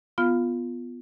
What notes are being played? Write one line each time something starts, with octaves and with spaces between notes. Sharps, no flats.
B3 F4 F5 F6